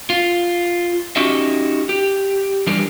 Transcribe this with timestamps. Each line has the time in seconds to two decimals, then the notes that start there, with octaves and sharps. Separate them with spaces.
0.10 F4
1.16 C#4 D#4 F#4 G4 D#5 E5
1.89 G4
2.67 E3 G3 D4 G4 A#4 D5